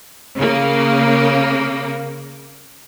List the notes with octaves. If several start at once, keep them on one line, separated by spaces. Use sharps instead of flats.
C#3 A#3